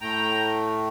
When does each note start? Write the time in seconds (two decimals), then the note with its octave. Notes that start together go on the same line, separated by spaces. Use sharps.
0.01 A2 A3 G5 A#5